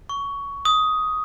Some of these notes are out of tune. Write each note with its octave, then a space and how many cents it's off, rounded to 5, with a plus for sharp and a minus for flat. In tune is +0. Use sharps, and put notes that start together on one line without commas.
C#6 +15
D#6 +10